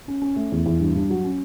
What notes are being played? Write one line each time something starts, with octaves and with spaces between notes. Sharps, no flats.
C#4
C#4
A3
E2
E2
G2
G2
F#3
C#4